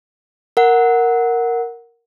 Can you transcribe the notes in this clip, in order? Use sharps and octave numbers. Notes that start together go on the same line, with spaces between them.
A#4 F#5